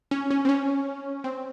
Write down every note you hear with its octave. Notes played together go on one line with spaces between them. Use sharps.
C#4
C#4
C4
C#4
C4